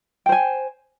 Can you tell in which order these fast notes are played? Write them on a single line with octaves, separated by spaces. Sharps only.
G5 C5 G#5